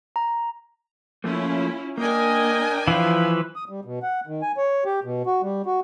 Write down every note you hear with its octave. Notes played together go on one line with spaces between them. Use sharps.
A#5
F3 A3 A#3 C#4 E4 F4
A#3 D4 A#4 D#5 G5 G#5
E3 F3 B4 F5
D#6
G3
B2
F#5
D#3
G#5
C#5
G4
B2
F#4
G3
F#4